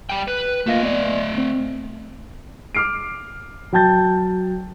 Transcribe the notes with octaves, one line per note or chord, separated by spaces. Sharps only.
G3 G5
B4
A3 A#3 F4 D#5 F5
B3 D5
C4
D6 F6 C7 D7
F#3 G5 A5 G6 A6